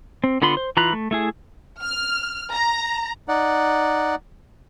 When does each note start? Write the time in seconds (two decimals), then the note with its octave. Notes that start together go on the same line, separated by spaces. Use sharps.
0.24 C4
0.42 D3 B3 F4 B5 C6
0.57 C5
0.77 E3 F4 A#5 B5 F#6
0.93 A3
1.11 A3 E4 G#4
1.82 F6
2.52 A#5
3.28 D#4 D5 F#5